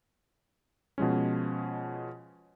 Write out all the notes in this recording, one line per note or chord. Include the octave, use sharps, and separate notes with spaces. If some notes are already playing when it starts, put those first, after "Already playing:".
B2 F3 G#3 C#4